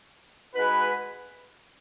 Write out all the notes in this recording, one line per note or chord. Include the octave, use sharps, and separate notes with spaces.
G#3 D#4 F#4 B4